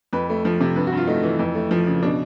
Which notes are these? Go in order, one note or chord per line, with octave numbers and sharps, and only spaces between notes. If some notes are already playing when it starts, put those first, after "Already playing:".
F2 B4
A3
F3
C3
G2 B4
F#4
G2 F4
A3 D#4
E3
F2
A3
F3
C#3
B2 D4